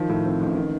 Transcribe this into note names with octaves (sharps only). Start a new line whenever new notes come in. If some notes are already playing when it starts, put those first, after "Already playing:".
Already playing: D#3 F3
A2
C4
A1
D#3